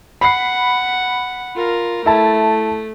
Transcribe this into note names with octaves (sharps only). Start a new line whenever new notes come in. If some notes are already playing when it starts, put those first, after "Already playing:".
F#5 B5 C7
F4 A#4
A3 E4 A5